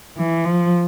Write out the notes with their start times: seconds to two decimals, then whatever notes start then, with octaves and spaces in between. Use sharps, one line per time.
0.17 E3
0.45 F3